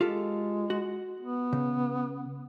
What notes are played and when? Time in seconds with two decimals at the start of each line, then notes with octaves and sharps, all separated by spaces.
0.01 G#3 F4 G4 A4
0.70 F#4
1.21 B3
1.53 C#3